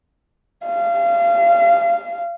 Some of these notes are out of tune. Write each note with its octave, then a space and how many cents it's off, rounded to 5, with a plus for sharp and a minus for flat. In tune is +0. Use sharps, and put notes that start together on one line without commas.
F5 -30